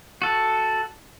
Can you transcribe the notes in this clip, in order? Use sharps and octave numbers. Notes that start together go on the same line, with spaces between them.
F#4 A4